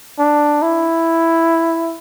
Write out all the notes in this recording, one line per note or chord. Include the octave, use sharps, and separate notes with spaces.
D4
E4